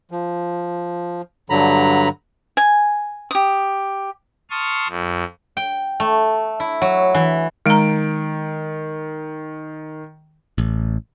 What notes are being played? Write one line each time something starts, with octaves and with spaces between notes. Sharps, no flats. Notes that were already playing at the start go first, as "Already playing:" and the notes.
F3
G2 D3 F#3 A#5 B5
G#5
G4 D#6
A5 C6 C#6 D#6 F6
F2
G5
A3
E4
F#3
E3
D#3 G#3 A#5 D7
A1